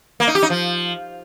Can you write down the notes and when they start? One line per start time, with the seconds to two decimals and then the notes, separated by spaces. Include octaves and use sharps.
0.20 A#3
0.28 D#4
0.35 G4
0.43 D#4
0.50 F3